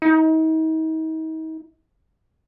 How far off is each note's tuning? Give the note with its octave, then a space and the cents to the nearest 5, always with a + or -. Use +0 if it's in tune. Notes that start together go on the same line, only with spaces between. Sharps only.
D#4 +40